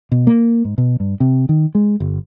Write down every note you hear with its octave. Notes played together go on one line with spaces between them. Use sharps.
B2
A#3
G#2
B2
G2
C3
D#3
G#3
G1